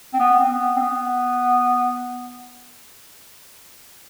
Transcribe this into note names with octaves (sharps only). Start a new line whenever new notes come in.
C4
B3
C4
B3
C4
B3